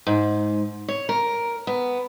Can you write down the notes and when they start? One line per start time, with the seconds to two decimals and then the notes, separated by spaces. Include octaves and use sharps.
0.07 G#2
0.88 C#5
1.09 A#4
1.67 B3